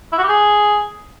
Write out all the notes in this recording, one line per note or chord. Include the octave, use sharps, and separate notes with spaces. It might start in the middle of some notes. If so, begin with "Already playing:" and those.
E4
F#4
G4
G#4